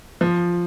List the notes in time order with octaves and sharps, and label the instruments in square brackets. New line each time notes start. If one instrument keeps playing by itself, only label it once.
[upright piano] F3